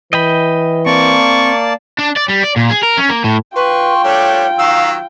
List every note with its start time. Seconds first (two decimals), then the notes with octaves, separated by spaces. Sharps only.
0.13 E3 D#5 G5 B5
0.86 A#3 C4 D5 A5 C#6
1.98 D4
2.16 D5
2.28 G3
2.43 D5
2.56 A#2
2.70 G#4
2.83 A#4
2.97 C#4
3.09 A#3
3.24 A2
3.56 F4 B4 G5 C6 C#6
4.04 G3 A3 D4 C#5
4.59 D#3 F#3 F5 E6